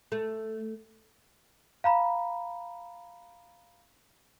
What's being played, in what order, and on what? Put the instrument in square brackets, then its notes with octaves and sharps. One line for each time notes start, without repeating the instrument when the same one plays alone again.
[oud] A3
[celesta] F5 A#5 B5